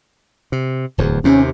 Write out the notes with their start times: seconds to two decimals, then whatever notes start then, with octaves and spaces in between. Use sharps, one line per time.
0.52 C3
0.98 D1 E2
1.24 D#2 C3 C#4